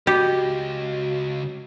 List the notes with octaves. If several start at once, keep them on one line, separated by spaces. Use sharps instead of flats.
C#2 F#4 G4 D#5